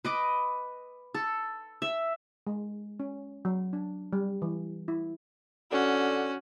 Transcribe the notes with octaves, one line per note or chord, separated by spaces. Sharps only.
B4 D#5 D6
A4
E5
G#3
C#4
F#3
D4
G3
E3
E4
D3 C#4 F#4